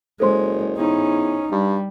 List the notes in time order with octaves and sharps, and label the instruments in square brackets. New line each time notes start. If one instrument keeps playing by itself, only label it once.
[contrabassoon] F#1 [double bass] G#3 [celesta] A4 C5 C6
[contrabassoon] E2 [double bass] C#4 D#4
[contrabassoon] G2 [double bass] G3